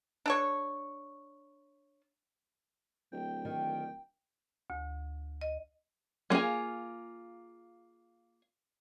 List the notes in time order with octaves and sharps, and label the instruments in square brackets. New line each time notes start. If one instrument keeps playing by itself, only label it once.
[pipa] D4 A4 C#5
[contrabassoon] D1 [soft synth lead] G5
[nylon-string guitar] D#3
[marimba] D2
D#5
[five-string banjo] G#3 A#3 F4 G#4 G#5